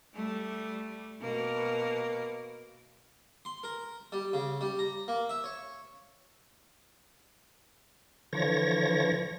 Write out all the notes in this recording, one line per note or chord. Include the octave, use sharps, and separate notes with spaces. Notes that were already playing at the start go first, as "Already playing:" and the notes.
G3 A3
B2 A#3
C6
A#4
G3
C#3
G3
A#5
A#3
E5
C#5
D3 E3 F3 C#5 A#6